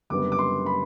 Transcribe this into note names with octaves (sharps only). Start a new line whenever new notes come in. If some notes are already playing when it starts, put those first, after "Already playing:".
F#1 F#2 D3 G3 B3 D6
D6
C6
B5